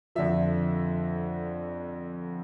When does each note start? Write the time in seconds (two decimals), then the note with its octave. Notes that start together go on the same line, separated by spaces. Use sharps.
0.15 F2 D3 F3 E5